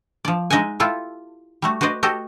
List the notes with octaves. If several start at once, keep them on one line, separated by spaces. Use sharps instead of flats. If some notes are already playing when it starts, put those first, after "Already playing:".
F3 D5
G#3 D#4 D#5 E5 F#5 G#5
E4 F4 G4 A4
G3 A3 F#4
F#4 B4 C5 D5 D#5
F#4 G4 A4 D#5